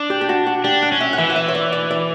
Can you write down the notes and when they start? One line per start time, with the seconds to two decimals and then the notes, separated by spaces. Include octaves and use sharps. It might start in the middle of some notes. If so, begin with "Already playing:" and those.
Already playing: D4
0.10 G4
0.21 G4
0.29 F#4
0.46 F#4
0.64 D4 G4
0.82 F#5
0.92 C#4
1.00 E5
1.13 F#5
1.18 E3 E5
1.30 F#5
1.36 E5
1.48 C#5
1.55 D5
1.73 D5
1.91 D5